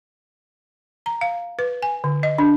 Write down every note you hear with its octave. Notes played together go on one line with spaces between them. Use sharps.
A#5
F5
B4
G#5
D3
D#5
D4